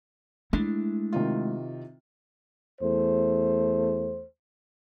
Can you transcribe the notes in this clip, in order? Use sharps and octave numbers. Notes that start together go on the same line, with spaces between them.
G#3 A3 D4 E4
C3 D#3 F4
E2 A3 C5